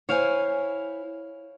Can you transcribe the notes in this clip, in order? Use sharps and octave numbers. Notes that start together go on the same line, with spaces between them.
E4 C5 C#5 F5 G#5